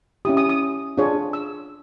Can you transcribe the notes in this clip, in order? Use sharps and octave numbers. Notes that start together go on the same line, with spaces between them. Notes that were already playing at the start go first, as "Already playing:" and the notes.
C#4 E4 G4 D#6
D#6
D#6
D4 F4 G#4 C#5
E6